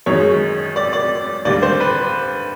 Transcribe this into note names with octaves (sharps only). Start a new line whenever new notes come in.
F#2 D#3 G#3 C#5
D5
D5
D#2 D3 G3 D5
C5
B4